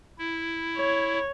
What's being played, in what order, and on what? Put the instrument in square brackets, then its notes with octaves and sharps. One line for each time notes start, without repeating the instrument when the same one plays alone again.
[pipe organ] E4
[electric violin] C#5